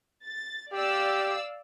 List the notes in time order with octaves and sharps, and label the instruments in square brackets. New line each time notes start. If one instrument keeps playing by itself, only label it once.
[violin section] A6
[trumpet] G4 [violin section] D5 F5 E6